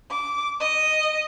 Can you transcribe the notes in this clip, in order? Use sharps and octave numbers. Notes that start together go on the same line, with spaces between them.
D6
D#5